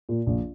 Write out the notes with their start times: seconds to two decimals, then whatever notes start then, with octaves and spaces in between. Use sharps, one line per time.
0.09 A#2
0.27 A#1